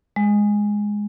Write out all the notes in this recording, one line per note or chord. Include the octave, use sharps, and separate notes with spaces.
G#3